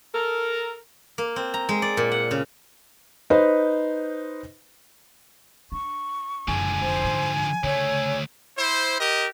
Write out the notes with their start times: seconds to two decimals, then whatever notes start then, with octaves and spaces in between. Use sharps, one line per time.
0.14 A4 A#4
1.18 A#3
1.36 C4
1.54 A#5
1.69 G#3
1.82 D5
1.97 A#2
2.12 F#5
2.31 C#3
3.30 D#4 B4 C5
5.72 D4 C#6
6.48 F#1 D3 F3 G#3 G#5
6.81 F1 C2 C5
7.04 G#2
7.63 D2 C#3 A3 C#5
8.58 E4 C5
9.00 G4 A#4 D#5